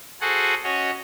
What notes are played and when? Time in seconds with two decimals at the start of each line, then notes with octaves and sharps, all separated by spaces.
0.21 F#4 G#4 A4 C5 F#5 G#5
0.64 C#4 F#4 C#5 D#5